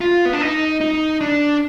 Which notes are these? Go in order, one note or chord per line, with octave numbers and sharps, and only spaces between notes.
F4
B3
D4
D#4
D#4
D4